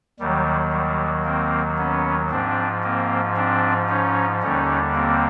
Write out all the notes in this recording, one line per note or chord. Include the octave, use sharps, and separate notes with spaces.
D#2 D#3 F#3 G3
G3
A#3 C4
B3 C#4
G#2 F3 C4 D4
A#3 C4
C4 D4
C#4 D#4
D#2 D3 G3 C#4 D#4
A#3 C4